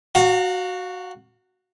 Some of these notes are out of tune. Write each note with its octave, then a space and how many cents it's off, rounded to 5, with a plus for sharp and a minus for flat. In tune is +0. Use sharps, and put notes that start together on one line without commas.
F#4 +0 F5 +30 A#5 -35